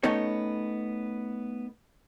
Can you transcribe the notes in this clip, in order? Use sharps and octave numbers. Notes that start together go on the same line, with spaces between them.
A3 B3 C#4 D#4 C#5